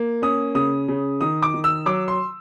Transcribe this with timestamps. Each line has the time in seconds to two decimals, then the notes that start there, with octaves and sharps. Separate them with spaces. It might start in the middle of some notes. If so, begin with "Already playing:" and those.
Already playing: A#3
0.22 C#4 D#6
0.55 C#3 D#6
0.88 C#3
1.21 D#3 D#6
1.42 D6
1.54 D#3
1.64 E6
1.86 F#3 D6
2.08 C6